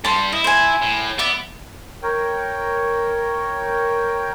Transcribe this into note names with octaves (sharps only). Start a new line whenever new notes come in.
G2 G3 A5 C6
E4 D#5
C5 G#5
A2
B3 D5 E5
A#4 C#5 G5